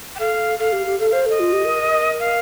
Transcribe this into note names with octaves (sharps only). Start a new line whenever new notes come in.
G5
A4 F5
A4 F5
G4
G4
A4 F5
C5 F5
A4 D#5
F4
G4
A#4
F5